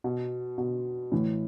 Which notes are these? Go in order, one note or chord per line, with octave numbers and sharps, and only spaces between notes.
B2
B2
A2 E3